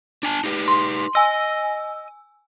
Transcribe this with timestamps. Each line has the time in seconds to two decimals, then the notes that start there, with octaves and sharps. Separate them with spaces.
0.23 D4 G#5 A5
0.44 D#4 G4 B4
0.68 C6
1.15 D#5 G#5 E6